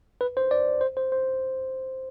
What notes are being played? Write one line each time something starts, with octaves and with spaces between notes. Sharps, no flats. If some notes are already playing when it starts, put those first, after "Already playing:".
B4
C5
D5
C5
C5
C5